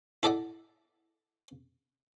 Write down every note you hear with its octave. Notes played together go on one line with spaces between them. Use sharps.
E4 A4 D5 D#5 F#5